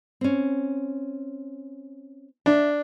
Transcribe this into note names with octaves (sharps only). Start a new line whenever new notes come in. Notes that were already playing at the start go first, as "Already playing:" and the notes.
C4 C#4
D4 E5